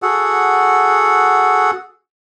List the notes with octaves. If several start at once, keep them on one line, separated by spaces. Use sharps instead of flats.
F#4 G#4 A4 F#5